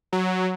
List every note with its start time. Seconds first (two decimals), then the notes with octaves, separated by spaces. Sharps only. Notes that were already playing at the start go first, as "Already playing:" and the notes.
0.13 F#3